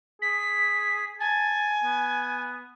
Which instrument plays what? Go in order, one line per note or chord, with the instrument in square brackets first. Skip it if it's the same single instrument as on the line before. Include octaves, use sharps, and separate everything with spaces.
[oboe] G#4 [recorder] B6
[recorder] G#5 [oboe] A5
[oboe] B3